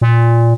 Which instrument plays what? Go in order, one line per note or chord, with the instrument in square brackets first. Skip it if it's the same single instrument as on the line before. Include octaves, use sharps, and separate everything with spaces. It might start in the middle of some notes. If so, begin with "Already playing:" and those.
[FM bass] A#2